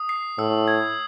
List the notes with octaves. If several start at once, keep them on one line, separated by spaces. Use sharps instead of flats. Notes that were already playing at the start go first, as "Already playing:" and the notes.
Already playing: D#6
C7
A2 E6
G#6